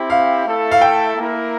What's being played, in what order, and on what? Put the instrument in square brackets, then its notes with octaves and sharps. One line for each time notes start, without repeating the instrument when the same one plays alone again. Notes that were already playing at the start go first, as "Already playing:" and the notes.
Already playing: [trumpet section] C4 E4 G4
[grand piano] F5
[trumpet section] A3 E4 A4 E5
[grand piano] F5
G5
[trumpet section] A#3 E4 A#4